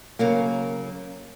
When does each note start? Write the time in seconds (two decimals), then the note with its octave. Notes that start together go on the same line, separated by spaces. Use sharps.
0.19 C#3 F#3 A#3